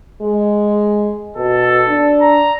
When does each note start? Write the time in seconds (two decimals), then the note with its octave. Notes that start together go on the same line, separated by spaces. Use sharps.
0.21 G#3
1.37 B2 A4
1.88 D4
2.21 A#5